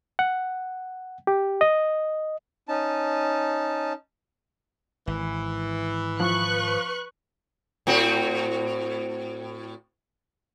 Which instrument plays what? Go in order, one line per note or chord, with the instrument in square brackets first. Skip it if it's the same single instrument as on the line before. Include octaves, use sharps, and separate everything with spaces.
[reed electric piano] F#5
G4
D#5
[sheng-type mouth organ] C#4 D#4 A5
[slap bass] G#1 [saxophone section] E3
[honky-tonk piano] F3 [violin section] B4 C#6 F#6
[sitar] A2 C4 F#4